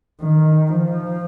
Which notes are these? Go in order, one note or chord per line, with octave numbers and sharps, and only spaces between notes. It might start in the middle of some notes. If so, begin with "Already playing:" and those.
D#3
F3